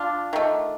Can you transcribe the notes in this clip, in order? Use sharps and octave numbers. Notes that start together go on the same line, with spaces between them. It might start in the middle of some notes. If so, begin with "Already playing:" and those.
Already playing: D4 F4
D#3 A3